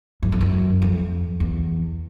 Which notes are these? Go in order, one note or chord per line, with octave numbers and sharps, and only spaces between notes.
F#2
F2
F#2
F2
E2